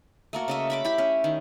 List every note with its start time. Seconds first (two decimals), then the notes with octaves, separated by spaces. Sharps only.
0.33 A3 A#3 F#4
0.48 C#3 D#5 E5
0.70 E5 B5 D6
0.85 E4 G4 B5
0.98 C#4
1.24 D#3